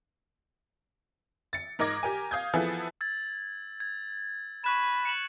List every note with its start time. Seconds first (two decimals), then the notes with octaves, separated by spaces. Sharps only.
1.53 A6 C#7
1.79 G#2 A#4 D#5 D6 G#6 A#6
2.03 G4 A#4 G#5
2.31 F5 D#6 G6 G#6
2.54 E3 F3 B3 E4 G#4 A4
3.01 E6 G#6 A6
3.80 G#6
4.64 B5 C#6 F#6 E7
5.05 C#7 E7 F#7